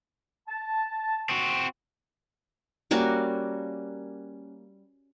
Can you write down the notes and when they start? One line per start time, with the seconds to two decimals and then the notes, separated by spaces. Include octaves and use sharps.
0.48 A5
1.29 C4 F#4
2.91 G3 A#3 C#4 F#4